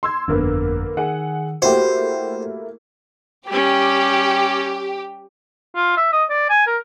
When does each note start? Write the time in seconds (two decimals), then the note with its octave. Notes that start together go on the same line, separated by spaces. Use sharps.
0.03 C6 E6 G#6
0.28 G1 F2 D3 A#3 B3
0.97 D#3 G#4 F#5
1.62 A3 A#3 E4 F#4 G4 C5
3.48 G3 C#4 G4
5.75 F4
5.97 E5
6.12 D#5
6.30 D5
6.50 G#5
6.67 A#4